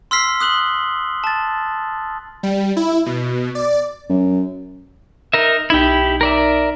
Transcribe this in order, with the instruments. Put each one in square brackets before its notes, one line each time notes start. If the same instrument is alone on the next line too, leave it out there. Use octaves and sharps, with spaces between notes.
[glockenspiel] C6 E6 F6 B6 C7
D#6 F#6 F#7 G7
A5 A6
[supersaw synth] G3
E4
B2
D5
[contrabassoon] F#2
[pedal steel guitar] D#4 A#4 E5
[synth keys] B1 D#4 B6 [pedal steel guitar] E4 G4
[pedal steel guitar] A#4 D5 E5